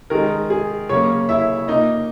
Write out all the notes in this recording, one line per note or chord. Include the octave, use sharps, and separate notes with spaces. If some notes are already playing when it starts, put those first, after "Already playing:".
D#3 G#3 A#4
G#4
C#3 F#3 A#3 C#4 C#5
E4 E5
A#2 A#3 D#4 D#5